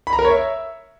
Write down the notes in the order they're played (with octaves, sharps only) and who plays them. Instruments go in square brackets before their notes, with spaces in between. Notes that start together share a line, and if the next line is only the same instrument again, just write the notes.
[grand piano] B5
A#5
A#4
C#5
E5